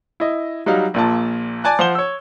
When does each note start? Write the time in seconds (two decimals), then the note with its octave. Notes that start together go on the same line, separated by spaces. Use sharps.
0.20 E4 D#5
0.66 F#3 G3 D#4 F5
0.94 A#1 A#2 A5
1.64 D5 G#5 A5 F#6
1.79 F3 C5 F#5 E7 G7
1.95 C#5 E6